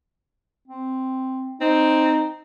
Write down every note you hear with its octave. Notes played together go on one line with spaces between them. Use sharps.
C4
C4 D#4